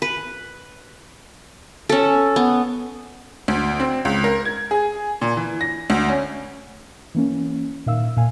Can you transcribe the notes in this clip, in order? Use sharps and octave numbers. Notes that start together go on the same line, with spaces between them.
B4
C#4 A4
B3
D2
C4
C#2
A#4
G#6
G#4
A#2
E3
A#6
D2
C#4
E3 A#3 C#4
A#2 D#3 E5 F5 E6
A#2 F5 G#5